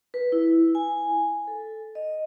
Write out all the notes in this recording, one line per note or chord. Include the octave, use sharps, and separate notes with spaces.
B4
E4
G#5
A4
D#5